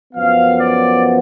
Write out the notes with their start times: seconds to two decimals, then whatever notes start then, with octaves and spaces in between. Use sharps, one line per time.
0.13 F#2 F3 B3 F5
0.59 D5